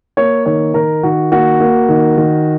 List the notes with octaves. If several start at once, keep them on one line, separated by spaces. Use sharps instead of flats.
A#3 C#5
D#3 C#5
D#3 A#4
D#3 F#4
A#3 F#4
A#3
D#3
D#3